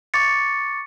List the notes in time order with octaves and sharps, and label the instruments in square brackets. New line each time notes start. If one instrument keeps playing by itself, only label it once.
[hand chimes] C#6 D6 A6 C#7